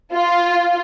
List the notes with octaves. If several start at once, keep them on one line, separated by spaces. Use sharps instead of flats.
F4